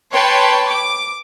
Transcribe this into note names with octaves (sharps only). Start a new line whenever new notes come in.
B4 C#5 G5 A5 B5 C6
D6